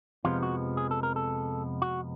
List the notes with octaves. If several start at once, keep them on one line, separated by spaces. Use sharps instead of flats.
F2 C3 F3 G#3 B3 F4
F#4
G#4
A4
A#4
A4
F#4